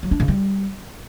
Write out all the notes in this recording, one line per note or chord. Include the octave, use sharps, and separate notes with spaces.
F#3
D4
C#3
G3